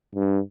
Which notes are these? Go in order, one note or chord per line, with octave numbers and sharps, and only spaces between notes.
G2